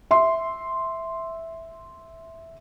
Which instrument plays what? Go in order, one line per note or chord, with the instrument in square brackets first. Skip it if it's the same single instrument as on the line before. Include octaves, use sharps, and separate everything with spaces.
[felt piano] E5 C6